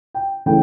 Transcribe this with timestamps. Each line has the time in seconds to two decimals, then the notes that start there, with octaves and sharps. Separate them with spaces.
0.14 G5
0.46 C#3 E3 A3 G5